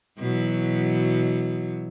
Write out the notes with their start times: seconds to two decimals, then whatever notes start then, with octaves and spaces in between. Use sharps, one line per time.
0.18 B2 E3 F#3